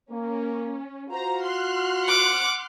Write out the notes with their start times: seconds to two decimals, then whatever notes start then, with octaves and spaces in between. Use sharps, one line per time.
0.11 A#3 C#4
1.09 F4 F#4 C5 A#5
1.43 C6 F6 F#6
2.05 F#5 D6